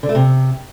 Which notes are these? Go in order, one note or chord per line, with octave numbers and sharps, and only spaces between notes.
D3
A3
C3